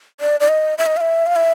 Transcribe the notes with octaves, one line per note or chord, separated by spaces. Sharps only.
D5
D5
D#5
E5
D#5
F5
E5
F5
E5